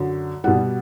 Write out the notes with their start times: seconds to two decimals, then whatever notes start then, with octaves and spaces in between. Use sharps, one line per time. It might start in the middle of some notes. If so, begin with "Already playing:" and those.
Already playing: F#2 D3 F#3
0.44 B2 G3 F#5